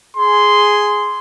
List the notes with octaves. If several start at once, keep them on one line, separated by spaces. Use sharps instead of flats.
G#4 C6